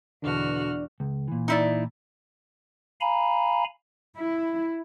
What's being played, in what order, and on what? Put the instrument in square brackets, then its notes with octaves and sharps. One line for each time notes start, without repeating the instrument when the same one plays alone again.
[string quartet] E2 F#4 F6 [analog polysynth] B2 D3 [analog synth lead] D4
[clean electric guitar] C#2
A#2 E3
[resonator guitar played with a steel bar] D#4 E4 D5
[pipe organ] F5 G#5 A#5 B5
[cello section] E4